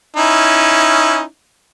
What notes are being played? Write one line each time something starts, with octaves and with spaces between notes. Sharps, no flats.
C#4 D#4 E4